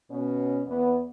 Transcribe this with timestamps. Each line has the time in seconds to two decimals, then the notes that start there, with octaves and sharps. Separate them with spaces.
0.11 B2 C#4
0.67 E2 B3